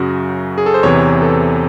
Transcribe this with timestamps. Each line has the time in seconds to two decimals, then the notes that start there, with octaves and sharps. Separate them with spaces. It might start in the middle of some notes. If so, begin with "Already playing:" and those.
Already playing: F#2 C#3 F#3 F#4
0.58 G#4
0.66 A4
0.74 C5
0.83 E2 C3 E3 C#5
1.22 A4